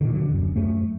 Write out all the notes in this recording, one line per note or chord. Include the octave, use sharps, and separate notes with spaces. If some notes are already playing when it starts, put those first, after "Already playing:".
A#2 D3 D#3
D3 F#3
D#1 F#2
F#2 A3